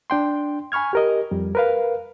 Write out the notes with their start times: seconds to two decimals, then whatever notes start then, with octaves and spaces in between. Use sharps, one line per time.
0.10 D4 G5 C6
0.72 G#5 B5 C#6 F6 G#6
0.93 G4 A#4 D#5
1.31 F2 G3
1.55 A#4 B4 F5